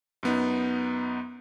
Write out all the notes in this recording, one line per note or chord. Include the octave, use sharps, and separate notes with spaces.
F#2 B3 D#4